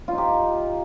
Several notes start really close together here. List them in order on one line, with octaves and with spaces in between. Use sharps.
F4 D#4 G4